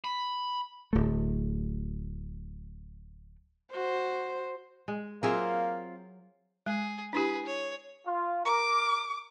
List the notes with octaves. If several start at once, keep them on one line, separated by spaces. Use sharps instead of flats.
B5
D1 A3
F#4 C5
G#3
F#3 A#3 C4 F4 G#4 E5
G#3 G#4
D4 E4 G4 G#4 B4
C#5
F4
A#4 D6